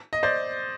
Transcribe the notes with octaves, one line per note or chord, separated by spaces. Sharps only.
D#5
C5 D5